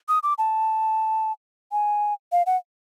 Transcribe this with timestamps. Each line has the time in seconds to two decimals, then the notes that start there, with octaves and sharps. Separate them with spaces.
0.09 D#6
0.23 D6
0.38 A5
1.72 G#5
2.32 F5
2.46 F#5